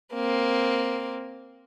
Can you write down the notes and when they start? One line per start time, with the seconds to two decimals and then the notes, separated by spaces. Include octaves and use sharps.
0.14 A#3 C4